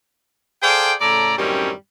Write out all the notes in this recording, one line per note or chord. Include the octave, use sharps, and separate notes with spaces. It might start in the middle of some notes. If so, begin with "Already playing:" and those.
G#4 A4 C5 D5 F5 G5
A2 C#3 A4 D5 A#5
F#2 A2 D#3 G3 C4 C#4